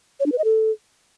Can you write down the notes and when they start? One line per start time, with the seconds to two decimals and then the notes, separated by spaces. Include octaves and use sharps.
0.20 C#5
0.26 D4
0.32 B4
0.38 D#5
0.44 A4